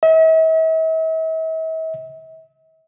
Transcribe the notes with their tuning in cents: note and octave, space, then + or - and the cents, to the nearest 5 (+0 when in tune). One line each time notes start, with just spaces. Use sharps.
E5 -45